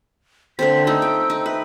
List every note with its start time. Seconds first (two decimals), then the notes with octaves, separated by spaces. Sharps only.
0.59 D3 A3 C4 B6
0.87 A3 D#4 E6
1.02 G5
1.30 D#4
1.46 B4 E5